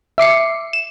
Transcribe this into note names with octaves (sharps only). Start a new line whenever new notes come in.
E5 D6 C7 C#7
E7